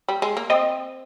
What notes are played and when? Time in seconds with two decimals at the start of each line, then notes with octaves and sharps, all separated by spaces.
0.08 G3
0.22 G#3
0.37 A#3
0.50 C4 D#5